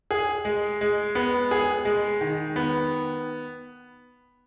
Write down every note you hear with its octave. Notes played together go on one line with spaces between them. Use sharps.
G#4
G#3
G#3
B3
G#4
G#3
D#3
B3